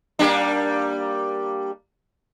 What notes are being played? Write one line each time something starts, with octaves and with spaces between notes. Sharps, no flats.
G3 A#3 D4